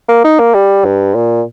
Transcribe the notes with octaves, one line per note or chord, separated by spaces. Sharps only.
A#3
D#4
A#3
G3
G2
A#2